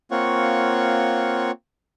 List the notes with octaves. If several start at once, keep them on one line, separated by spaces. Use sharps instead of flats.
A#3 C4 F4 C#5 F#5 C#6